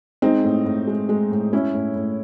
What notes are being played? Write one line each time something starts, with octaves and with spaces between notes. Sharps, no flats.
G#3 C4 D#4
A2
A2
G#3
G#3
A2
G#3 C#4 E4
A2
A2